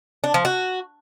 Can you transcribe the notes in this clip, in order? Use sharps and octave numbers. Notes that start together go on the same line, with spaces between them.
D4
F3
F#4